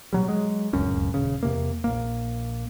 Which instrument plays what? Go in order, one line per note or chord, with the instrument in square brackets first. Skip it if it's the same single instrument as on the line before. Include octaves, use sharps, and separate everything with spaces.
[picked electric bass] B2 F#3 G3
F#3 G#3
D1 C#2 F#2 C#4
D#1 C#3
E2 C3 A#3
A#1 A#3